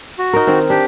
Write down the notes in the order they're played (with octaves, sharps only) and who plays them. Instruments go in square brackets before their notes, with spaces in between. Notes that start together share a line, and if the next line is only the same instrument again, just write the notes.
[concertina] F#4
[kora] D#4 A#4
D#3 C4
[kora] D4 [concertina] G4